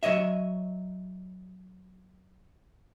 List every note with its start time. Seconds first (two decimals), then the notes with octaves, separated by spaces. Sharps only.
0.03 F#3 C#5 D#5 E5